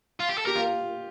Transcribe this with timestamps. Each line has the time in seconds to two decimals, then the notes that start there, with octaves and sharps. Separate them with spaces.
0.20 F4
0.29 G4
0.38 A4
0.46 G4 A#4
0.56 F4